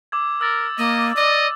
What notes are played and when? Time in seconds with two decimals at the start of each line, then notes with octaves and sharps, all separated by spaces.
0.12 D6 E6 G#6
0.41 A#4 E6 A6
0.78 A#3 D#5
1.16 D5 D#5